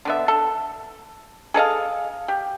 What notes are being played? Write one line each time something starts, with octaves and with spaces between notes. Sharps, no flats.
D3 B3 E5
A4
G#4 A4 D#5 F5
G4